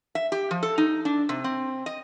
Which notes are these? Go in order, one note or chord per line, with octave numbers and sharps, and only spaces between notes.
E5
G4
F3
A4
D#4
D4
C3
C4
D#5